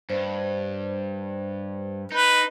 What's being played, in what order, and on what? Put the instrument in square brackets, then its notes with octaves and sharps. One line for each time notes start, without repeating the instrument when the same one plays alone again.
[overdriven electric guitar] G2 [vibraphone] C5
[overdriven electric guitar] D#4 [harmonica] B4